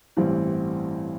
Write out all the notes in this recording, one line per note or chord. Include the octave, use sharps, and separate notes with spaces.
A1 G2 E3 G3 C4